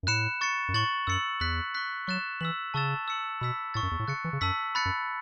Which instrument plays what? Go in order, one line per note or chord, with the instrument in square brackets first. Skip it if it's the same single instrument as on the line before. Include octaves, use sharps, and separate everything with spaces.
[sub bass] F#2
[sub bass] A2 [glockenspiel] B5 F#6 C#7 E7
[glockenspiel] C#6 A6 C#7
[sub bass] F#2
[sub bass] A2 [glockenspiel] C#6 A6 F#7
[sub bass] F#2 [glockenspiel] E6 A6 C#7 F#7
[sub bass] E2 [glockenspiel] F#6 B6 F#7
[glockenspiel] C#6 F#6 B6
[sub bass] F#3 [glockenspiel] C#6 F#6 A6 E7
[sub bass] E3 [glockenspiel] E6 B6 F#7
[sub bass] C#3 [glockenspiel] A5 C#6 E6 A6 E7
[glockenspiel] E6 C#7 F#7
[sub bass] B2 [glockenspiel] B5 E6 B6
[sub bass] A2 [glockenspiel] C#6 E6 A6
[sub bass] F#2
E2
A2
[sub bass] C#3 [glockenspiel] F#6 A6 C#7
[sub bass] E3
C#3
[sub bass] F#2 [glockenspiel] A5 E6 B6 F#7
[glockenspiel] B5 F#6 A6 C#7
[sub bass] F#2